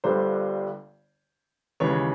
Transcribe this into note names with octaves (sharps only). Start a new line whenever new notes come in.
G1 G2 D3 G3 C5
D#2 C#3 E3 G#3 C#5